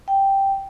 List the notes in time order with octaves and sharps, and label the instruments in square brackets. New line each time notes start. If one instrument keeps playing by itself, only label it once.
[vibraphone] G5